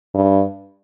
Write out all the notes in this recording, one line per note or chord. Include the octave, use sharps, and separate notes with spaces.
G2